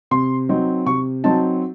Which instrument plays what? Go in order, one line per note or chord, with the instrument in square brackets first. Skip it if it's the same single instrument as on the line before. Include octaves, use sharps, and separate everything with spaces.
[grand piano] C3 C6
F#3 C4 D#4
C3 C#6
F#3 C4 D#4 A5